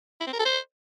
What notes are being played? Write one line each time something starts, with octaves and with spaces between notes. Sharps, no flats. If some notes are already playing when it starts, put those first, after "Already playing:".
E4
C4
A#4
A4
C5